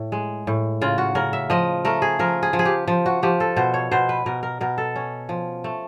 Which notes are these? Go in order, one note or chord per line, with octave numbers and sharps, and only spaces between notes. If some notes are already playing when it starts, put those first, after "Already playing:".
Already playing: A2
G#3
A2
C#3 F4
F#4
C#3 A#4
E5
F3 D#5
A3 A#4
G#4
F3 A#4
G#4
F3
G#4
G4
F3
F#4
F3 G4
A4
B2 C5
C#5
B2 C5
B4
B2 A#4
A#4
B2 A#4
A4
C#4
F3
A3